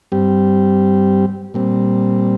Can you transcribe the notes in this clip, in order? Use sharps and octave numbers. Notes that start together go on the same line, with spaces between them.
G2 G3 C4 G4
A#2 G3 C4